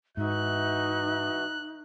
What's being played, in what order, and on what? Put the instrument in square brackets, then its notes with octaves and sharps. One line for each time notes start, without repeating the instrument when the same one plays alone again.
[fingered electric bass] G#2 [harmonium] E3 F#4 E5 [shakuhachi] D#4 [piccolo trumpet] F#6